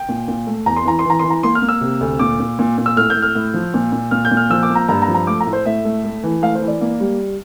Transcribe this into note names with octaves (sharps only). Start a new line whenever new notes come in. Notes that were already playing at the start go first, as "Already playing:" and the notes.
Already playing: G5
A#2
A#2
A3
E2 A#5
C6
E3 A#5
C6
E3 A#5
E3 C6
A#5
A#3 C6
F6
A#3
E6
C3
D2
A#2 D6
A#2
A#2
A#2
E6
A2 F6
G6
A2
F6
A2
F3
A#2
A#2
A#2 F6
G6
A#2
F6
F3 E6
D6
A#3
A#5
G2 A#5
A#5
F3
A#5
A3 D6
A#5
A2
C5
A2 E5
A3
A3
E3
A3 F5
C5
E3
D5
A#3
G3